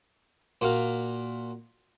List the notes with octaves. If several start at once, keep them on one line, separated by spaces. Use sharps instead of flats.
A#2 F#4 F5